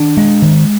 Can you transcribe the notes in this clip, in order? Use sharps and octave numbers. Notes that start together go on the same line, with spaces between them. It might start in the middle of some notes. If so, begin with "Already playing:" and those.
Already playing: D#3 D4
G#3
D#3